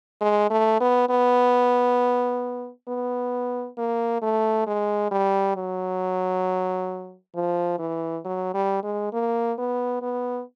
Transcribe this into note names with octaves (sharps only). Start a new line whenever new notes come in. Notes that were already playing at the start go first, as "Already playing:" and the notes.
G#3
A3
B3
B3
B3
A#3
A3
G#3
G3
F#3
F3
E3
F#3
G3
G#3
A#3
B3
B3